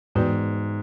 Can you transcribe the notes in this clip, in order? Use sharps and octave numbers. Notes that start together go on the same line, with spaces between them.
G#2 E3 B3 F#4 B4